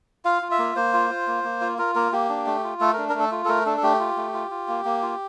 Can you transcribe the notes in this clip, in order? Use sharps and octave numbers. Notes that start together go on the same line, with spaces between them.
F4 F5
F4
E5
A#3
A#3 C5
F4
F4
A#3
A#3
F4
F4 A#4
A#3 A#4
A#3 G4
D4
A3
F4
A3 A4
D4 A#4
A#4
A3 A4
F4
A4
A3 A#4
D4 A4
A4
A3 G4
F4
A3
F4
F4
A#3
A#3
F4